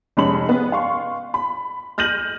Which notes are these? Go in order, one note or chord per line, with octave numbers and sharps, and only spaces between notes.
F1 G#3 C#4 G#4 B5 F#7
B3
F5 C6 C#6
B5
F6 G6 A#6 D#7 F#7